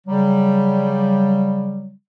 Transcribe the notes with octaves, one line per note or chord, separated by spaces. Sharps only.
C#3 F#3 G3